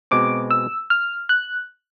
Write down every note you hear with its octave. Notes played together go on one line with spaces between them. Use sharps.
B2 G#3 C4 D6
E6
F6
F#6